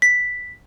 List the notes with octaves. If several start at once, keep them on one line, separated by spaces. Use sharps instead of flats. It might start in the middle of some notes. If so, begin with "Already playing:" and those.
B6